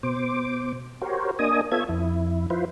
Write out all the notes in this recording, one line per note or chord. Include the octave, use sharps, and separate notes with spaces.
B2 C5 D6
F#4 G4 A#4 C5 C#5
A#3 D4 D#5 G#5 D#6
B3 F4 A4 C#5 E5 G#6
F2 E4
F3 E4 F4 B4 C5